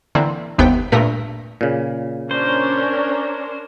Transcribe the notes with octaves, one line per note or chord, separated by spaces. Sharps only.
D3 E3 A#3 C4
G1 D#2 C3 B3 G5 B6
G2 A#2 A3 A#4 B6
A#2 C#3
C#4 D4 A#4 C5